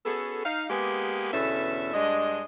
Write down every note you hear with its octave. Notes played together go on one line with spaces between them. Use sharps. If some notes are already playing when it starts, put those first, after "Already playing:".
B3 C#4 F#4 G#4 A4
D#4 F5
G#3 A#3 B3 G4 G#4 B4
E2 B2 D3 C#4 A4 E5
G2 G#3 D4 D#5